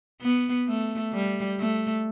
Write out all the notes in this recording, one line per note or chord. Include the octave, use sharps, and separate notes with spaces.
B3
A3
G3
A3